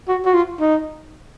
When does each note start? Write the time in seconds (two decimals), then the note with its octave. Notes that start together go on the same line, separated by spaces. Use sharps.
0.08 F#4
0.25 F#4
0.34 F4
0.60 D#4